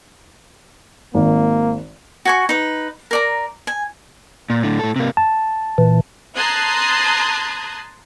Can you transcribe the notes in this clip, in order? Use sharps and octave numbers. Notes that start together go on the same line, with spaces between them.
G#1 A#3
F#4 G#5 C#6
D#4 B4
A#4 D5 A#5
G#5
A#2
A2 D3
A2 A4
C3 A#3
A5
A#2 E3
A5 A#5 C6 D#6 F#6 G#6